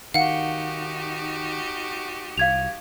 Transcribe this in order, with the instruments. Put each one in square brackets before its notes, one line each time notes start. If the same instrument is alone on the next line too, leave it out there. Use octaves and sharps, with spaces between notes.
[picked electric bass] D#3 [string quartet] D#4 F#4 G4 [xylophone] F5 F#5
[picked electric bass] C2 [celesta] F5 G#6 F7